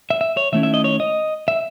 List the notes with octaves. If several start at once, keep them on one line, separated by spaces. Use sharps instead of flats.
E5
E5
C#5
D#3 A3 C#4 E4 E5
E5
D#5
C#5
D#5
E5